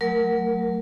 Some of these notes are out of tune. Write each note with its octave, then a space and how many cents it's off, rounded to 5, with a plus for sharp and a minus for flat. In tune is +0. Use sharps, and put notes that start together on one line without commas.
F#3 +0 A3 +15 A#4 +0